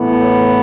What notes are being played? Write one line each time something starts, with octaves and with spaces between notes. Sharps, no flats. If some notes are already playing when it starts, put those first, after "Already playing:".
Already playing: A2 E3 B3
C#5